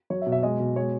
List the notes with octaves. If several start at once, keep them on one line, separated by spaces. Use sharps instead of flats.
F#3 C#5
E5
B2
E5
G#3 D#5
B2
G#3 C#5